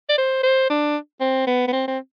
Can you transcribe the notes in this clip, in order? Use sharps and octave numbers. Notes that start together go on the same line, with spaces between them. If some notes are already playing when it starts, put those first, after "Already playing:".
D5
C5
C5
D4
C4
B3
B3
C4
C4